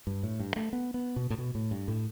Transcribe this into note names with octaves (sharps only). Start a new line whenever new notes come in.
G2
A2
G2
A3
B3
B3
B2
A2
B2
A2
G2
A2